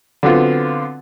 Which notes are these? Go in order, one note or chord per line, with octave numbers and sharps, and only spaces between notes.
D3 F#3 B3 C4 F4